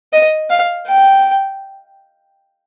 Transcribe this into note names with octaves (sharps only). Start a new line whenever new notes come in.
D#5
F5
G5